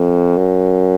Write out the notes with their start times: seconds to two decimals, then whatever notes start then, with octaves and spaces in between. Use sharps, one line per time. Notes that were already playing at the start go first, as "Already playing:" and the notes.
Already playing: F2
0.37 F#2